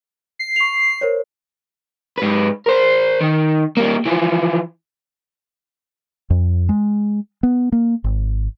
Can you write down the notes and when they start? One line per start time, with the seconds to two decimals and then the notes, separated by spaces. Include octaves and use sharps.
0.39 C7
0.56 C#6 F7
1.01 A#4 C5 C#5
2.18 G#2 B4
2.66 A#4 C5
3.21 D#3
3.77 G3 A#3
4.06 E3 F3
6.30 F2
6.69 G#3
7.43 B3
7.72 A#3
8.04 G#1